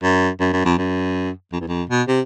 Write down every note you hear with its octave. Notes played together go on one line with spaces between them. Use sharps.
F#2
F#2
F#2
F2
F#2
F2
E2
F2
B2
C3